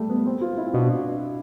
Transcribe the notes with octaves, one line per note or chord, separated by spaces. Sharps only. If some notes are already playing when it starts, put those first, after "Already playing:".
Already playing: G3 A3
B3
C4
F4
E4
C4
B2 D4